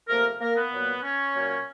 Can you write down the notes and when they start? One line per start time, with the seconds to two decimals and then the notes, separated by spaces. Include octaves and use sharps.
0.08 C3 F3 A3 A#3 A#4
0.40 A#3 A#4
0.55 B3 B4
0.71 A#2 F#3 A#3
1.02 C#4 C#5
1.34 A#2 F#3 A#3